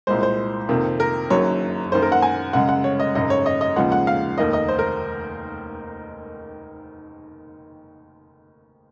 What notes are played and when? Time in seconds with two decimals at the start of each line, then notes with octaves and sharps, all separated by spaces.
0.07 C2 A#2 G#3 C5
0.23 C5
0.69 F2 C3 D#3 A#3
1.00 A#4
1.30 F#1 F#2 D#3 F#3 C#5
1.92 F#2 D#3 A#3 C5
2.02 A#4
2.12 F#5
2.22 G#5
2.53 F#2 C#3 G#3 F#5
2.69 F#5
2.84 C#5
3.00 D#5
3.15 G#1 F#2 C#3 D#5
3.30 C#5
3.46 D#5
3.61 D#5
3.76 D#2 C#3 F3 G#3 F#5
3.92 F#5
4.07 F5
4.38 F1 D#2 D#3 A#3 D#5
4.53 D#5
4.68 C5
4.79 A#4